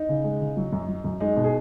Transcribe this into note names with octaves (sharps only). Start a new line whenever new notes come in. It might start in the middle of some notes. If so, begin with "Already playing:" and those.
Already playing: D#4
C#3
G#3
C#3
F#3
F#2
F#3
F#2
G#3 D#4
B2
G#4